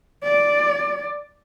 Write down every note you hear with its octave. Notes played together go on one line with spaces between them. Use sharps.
D5